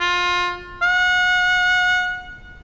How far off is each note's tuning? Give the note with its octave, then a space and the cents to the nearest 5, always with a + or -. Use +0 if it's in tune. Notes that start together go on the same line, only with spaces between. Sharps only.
F4 +25
F#5 -30